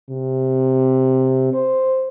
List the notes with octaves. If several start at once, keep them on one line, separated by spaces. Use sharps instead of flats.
C3
C5